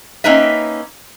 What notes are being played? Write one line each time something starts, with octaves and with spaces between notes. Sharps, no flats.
A#3 C4 C#4 D#4 B4 E5